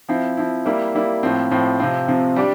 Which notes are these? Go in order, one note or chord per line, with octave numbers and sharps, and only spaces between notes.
F3 C4 E4
F3 C4 E4
G3 A#3 E4
G3 A#3 E4
A2 F3 C4
A2 F3 C4
C3 F3 C4
C3 F3 C4
G3 D4 G4